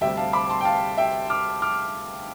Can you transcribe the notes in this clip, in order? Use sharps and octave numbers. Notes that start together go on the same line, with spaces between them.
D2 C3 G3 C4 E5 G5
F5 A5
B5 D6
A5 C6
G5
F5 A5
E5 G5
D6 F6
D6 F6